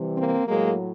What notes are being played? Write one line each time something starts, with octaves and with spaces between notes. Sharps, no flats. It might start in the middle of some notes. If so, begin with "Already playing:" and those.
Already playing: C3 E3 G3
A#3 C4
A2 F#3 G#3 A#3